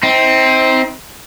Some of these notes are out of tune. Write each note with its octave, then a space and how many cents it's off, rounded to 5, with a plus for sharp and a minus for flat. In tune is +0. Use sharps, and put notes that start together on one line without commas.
C4 +0 D#4 +40